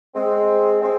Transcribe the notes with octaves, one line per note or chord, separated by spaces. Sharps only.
G#3 C4
G#3 C4